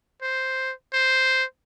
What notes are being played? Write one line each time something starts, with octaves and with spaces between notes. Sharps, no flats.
C5
C5